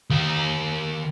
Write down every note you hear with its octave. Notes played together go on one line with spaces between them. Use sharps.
D#3 F5